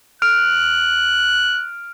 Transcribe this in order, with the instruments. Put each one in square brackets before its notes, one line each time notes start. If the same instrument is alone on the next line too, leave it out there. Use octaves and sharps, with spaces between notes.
[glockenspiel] F6 D7 F7 [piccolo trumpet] F#6